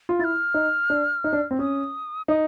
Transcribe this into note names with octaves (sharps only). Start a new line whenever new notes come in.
F4
E4 A6
F6
D#4
D4
D#4
D4
C4
C#4 D#6
D#4 D#6